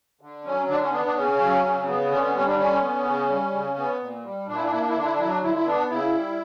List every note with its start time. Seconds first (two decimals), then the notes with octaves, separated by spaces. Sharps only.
0.21 D3
0.45 F#3 C#4
0.68 D3 D4
0.81 C#4
0.92 B3 D4
1.05 D4
1.17 C#3 C#4
1.40 F#3
1.64 C#3
1.88 B3
2.11 D3 C#4
2.23 C#4
2.34 G3 C#4
2.47 D4
2.58 D3 C#4
2.82 B3
3.05 C#3
3.29 G3
3.53 C#3
3.77 B3
4.01 A#2
4.24 G3
4.47 A#2 D4
4.55 E4
4.64 D4
4.71 A#3 E4
4.80 D4
4.88 E4
4.95 D3 D4
5.04 E4
5.12 D4
5.19 F#3 E4
5.28 D4
5.42 D3 E4
5.54 E4
5.66 B3 D4
5.90 C#3 E4
6.13 G3